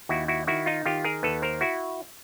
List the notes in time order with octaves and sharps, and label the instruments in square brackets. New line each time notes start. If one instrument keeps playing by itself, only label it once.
[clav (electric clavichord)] D#2 E4 F#4
E4 F#4
D#3 E4 F#4
D#4 F4
D#3 F4 G4
G#4 A#4
D#2 A4 B4
A#4 C5
E4 F#4